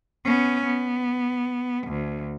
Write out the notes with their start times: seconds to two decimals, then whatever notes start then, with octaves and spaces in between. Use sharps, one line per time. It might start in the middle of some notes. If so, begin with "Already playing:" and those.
0.25 B3 C#4
0.65 B3
1.87 D2